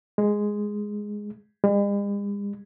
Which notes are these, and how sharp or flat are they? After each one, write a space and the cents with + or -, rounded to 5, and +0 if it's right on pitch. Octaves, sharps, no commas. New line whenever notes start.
G#3 +0
G#3 -45